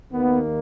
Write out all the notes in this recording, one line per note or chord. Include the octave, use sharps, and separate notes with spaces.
D#2 D#3 A#3 B3